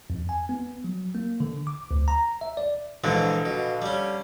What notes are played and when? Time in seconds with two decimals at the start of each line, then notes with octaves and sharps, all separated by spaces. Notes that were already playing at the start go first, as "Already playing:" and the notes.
0.10 F2
0.29 G#5
0.49 B3
0.84 F#3
1.15 A#3
1.40 D3
1.67 D6
1.91 D2
2.08 A#5
2.41 E5
2.57 D5
3.04 A#1 G#2 D3 E3 G#3
3.46 B2
3.82 G3 C#4